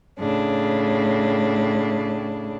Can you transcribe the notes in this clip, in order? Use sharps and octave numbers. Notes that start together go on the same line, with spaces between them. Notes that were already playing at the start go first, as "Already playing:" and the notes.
A2 C#3 D4